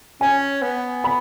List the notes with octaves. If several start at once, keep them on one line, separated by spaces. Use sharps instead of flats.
C#4 G#5
B3
B5